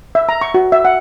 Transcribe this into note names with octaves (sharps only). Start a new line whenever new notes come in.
E5
A#5
C#6
F#4
E5
F#5